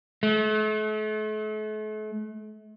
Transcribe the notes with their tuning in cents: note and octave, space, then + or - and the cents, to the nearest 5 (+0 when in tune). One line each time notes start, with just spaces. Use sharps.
A3 -40